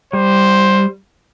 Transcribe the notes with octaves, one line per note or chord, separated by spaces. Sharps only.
G3 C5